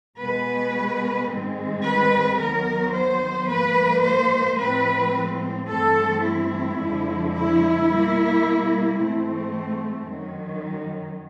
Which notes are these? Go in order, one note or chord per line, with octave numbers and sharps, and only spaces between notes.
B2 G#3 B3 B4
G#2 D#3 G#3 C4
B4
D#2 D#3 F#3 B3 A#4
C5
G#2 F3 A#3 B4
C5
A2 F3 G#3 C4 B4
G2 E3 A3 C4 A4
E4
F2 D3 F3 G#3
E4
B2 G3 A#3
G#2 E3 A3 C4
F#2 D#3 F#3